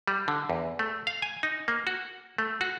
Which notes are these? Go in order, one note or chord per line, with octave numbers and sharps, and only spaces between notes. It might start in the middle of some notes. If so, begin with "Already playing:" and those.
G3
D3
E2
A3
F5
G#5
D#4
A#3
F#4
A3
F#4